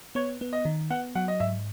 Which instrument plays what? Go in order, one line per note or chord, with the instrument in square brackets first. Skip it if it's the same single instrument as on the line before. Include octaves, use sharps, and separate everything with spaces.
[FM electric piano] B3 [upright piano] C#5
[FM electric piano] B3
[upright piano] D#5
[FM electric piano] D#3
[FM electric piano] B3 [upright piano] F#5
[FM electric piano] F#3 [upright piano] F#5
[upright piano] D#5
[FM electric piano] G#2 [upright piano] E5